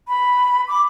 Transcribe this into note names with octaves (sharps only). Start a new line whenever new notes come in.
B5
D6